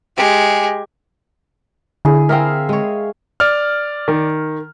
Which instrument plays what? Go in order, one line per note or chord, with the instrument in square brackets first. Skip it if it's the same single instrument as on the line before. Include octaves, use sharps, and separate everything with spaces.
[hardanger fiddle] G#3 G4
[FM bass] D3 [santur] E4 G#4
[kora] C4 G#4 A#4 [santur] E5 F5
[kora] G#3 C#5
[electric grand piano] D5 F6
[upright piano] D#3